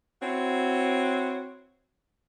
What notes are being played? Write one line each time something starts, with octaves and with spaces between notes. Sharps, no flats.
C4 E4 F#4 C5 C#5